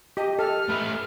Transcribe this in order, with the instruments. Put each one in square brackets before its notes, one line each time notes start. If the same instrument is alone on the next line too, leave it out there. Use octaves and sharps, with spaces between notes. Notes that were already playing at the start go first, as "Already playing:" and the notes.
[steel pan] G4 [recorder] D#5
[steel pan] A4 [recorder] F6
[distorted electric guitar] A3 B4